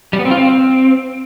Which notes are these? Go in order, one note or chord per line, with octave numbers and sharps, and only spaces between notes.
G3
B3
C4
F4
C4